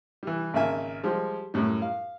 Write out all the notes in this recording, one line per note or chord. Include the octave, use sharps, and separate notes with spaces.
E3 G3
G#1 C#3 A#3 A#4 E5 G#5
F3 G3 G#3 G4
F#2 A2 G3
F5